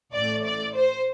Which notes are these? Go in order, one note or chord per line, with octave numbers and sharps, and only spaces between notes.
A1 A2 A3 D5
D5
C5